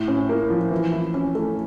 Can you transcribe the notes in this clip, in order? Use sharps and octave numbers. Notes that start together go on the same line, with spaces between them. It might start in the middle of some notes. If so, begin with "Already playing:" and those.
Already playing: A2
C#4
A#3
F3
E3
E4
C#4
A3